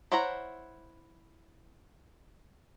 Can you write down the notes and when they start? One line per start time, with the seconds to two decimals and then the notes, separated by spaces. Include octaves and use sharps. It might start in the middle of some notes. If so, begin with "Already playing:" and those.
0.12 E4 C5 C#5 F#5 A#5